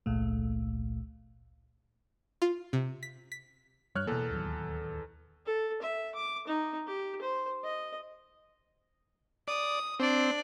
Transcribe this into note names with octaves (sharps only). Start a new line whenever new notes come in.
G#1 C#2 A#2 A3
F4
C3
B6
B6
G2 G3 C#5 F6 F#6
E2 B2 A#3 A4
D1 D#2 F#3
A4
E5
D6
D#4
G4
C5
D#5
D5 D#6
C4 D4 D5